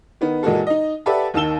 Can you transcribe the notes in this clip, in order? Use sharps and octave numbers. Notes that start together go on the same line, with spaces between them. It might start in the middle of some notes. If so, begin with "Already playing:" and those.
D#3 B3 D#4
A#2 E3 G#3 A#3 F#4 A4
D#4 D#5
G4 A4 B4 D5 E5 F#5
D#2 D#3 A5 E6 E7 G7